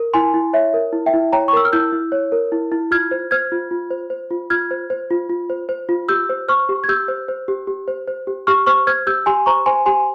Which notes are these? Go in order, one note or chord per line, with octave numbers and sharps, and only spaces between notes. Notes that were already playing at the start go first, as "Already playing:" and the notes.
Already playing: A#4
E4 G#5 C6
E4
C#5 E5
A#4
E4
E5 G5
E4
C#5 G5 A#5
C#6
A#4 E6
F6
E4 E6 G6
E4
C#5
A#4
E4
E4
F4 F6 G#6
C5
C5 F6 G#6
F4
F4
C5
C5
F4
F4 F6 G#6
C5
C5
F4
F4
C5
C5
F4
G4 E6 G6
C5
C5 C#6 F6
G4
G#6
G4 E6 G6
C5
C5
G4
G4
C5
C5
G4
G4 C#6 F6
C5 C#6 F6
C5 F6 G#6
G4 E6 G6
G4 G#5 C6
C5 A#5 C#6
C5 G#5 C6
G4 G#5 C6